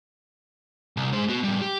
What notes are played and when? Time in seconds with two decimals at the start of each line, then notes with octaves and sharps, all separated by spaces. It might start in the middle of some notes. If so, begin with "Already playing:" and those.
0.97 C2
1.13 G#3 C5
1.29 B3 F#4
1.44 A2 G3
1.61 G4